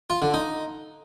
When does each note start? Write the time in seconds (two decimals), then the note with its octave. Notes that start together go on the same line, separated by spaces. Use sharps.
0.10 F4
0.22 D3
0.34 D#4